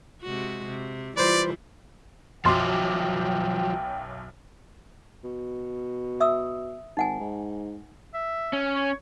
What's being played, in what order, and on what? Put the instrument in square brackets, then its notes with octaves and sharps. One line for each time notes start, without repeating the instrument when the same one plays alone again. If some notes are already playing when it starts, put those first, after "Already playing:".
[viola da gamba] C3 G#3 F#4
C3
[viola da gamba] E3 G3 F4 [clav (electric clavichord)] B4 C5 [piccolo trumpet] D5
[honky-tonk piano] B1 F#2 D6 [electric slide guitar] F3 F#3 [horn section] G5 [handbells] C6 A6
[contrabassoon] B2
[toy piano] E5 D#6 E6
[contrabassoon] G#1 [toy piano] D#4 F#5 G#5
[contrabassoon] G#2
[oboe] E5
[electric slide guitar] C#4
[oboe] C#5